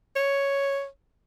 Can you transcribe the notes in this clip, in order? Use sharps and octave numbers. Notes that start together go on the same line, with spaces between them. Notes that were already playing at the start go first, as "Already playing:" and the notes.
C#5